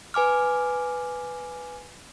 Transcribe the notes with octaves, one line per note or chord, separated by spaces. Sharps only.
B4 G#5 D6 F6